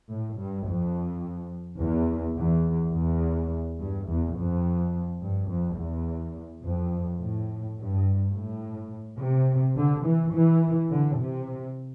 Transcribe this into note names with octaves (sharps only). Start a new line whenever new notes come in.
A2
G2
F2
E2
E2
E2
G2
E2
F2
G2
F2
E2
F2
A2
G2
A2
C3
D3
E3
E3
D3
C3